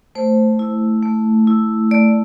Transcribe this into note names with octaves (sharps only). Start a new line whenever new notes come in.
A3 C5
E4
A3
E4
A3 D5